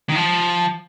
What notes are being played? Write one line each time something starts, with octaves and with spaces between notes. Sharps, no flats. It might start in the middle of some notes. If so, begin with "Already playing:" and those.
D#3
F3